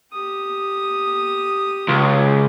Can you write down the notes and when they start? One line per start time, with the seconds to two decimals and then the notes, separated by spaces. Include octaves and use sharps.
0.13 G4 D#6
1.88 C#2